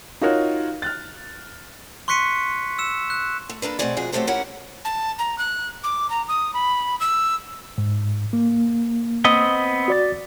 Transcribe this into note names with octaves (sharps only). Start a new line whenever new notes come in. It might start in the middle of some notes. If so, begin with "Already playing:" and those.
D#4 F4 F#4 A#4 C#5
F6 F#6 A6
C6 C#6 F#6 B6 C#7 D#7
E6 C#7 E7
F#6
A3
A#3 D4 A4 B4
B2 F#3 A3 C4 G#4 D5
F2 B2 G#3 G#4
F#3 A3 C4 G4 A4 C5
C#4 E4 G4 A#4 C#5 F#5
A5
A#5
F#6
D6
A#5
D#6
B5
E6
G#2
A#3
B3 C4 D#5
F#4 D5 A6